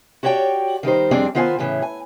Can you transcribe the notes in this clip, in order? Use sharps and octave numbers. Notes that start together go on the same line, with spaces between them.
F#4 G4 C#5 D5 G5
D#3 G3 D#4 C5
F2 G3 C4 D4 G#4 D5
D#3 B3 F4 C5 E5 G#5
A2 C#3 E3
G#5